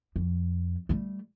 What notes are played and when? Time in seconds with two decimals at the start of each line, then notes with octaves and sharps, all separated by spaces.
0.16 F2
0.89 G3 A3